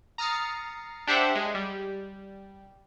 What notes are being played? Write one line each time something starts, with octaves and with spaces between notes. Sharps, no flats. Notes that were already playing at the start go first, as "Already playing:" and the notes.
A#5 D#6 F6 A6 C7 C#7
D4 G4 C5 E5 F#5
G#3
G3